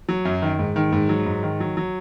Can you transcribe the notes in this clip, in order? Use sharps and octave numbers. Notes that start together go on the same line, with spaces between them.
F#3
F#2
D#3
G#2
D#3
G#2
F#3
G#2
D#3
F#3
F#3